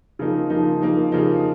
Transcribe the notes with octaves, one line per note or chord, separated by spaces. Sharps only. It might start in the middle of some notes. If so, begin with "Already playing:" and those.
C#3 F3 A#3 D#4
C#3 F3 A#3 D#4
C#3 F3 A#3 D#4
C#3 F3 A#3 D#4